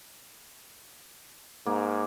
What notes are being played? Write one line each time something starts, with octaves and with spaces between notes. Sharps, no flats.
G#2 A#3